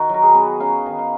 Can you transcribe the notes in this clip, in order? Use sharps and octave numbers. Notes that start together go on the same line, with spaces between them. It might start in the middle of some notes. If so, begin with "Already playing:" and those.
Already playing: D#3 F#4
F#3 A#4
G#4
B3
C#4 F5
D#3
F5